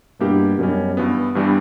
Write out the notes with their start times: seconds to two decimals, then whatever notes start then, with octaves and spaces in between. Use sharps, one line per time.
0.20 G2 B2 A#3 E4 G4
0.58 F#2 B2 G3 C#4
0.97 G2 E3 B3
1.35 G2 E3 G3 B3 D4